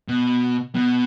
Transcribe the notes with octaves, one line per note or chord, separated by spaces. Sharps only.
B2
B2